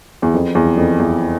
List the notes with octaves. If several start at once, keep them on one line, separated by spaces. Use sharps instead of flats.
E2
F2
E2
F2
E2